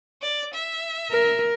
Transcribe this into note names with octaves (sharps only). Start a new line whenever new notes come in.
D5
E5
A#4